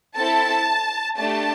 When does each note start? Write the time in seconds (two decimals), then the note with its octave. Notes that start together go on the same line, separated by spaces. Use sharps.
0.16 C4 E4 A4 A5
1.18 A3 D4 G4 A5